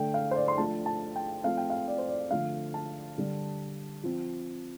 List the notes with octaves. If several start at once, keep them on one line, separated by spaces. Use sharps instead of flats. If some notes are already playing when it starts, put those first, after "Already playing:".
Already playing: D3 A3 D4 G5
F5
C5
D5
C6
F3 A3 D4 A5
A5
G5
F3 A3 C4 F5
G5
F5
D5
C5
D5
D3 F3 A3 D4 F5
A5
D3 G3 D4
F3 C4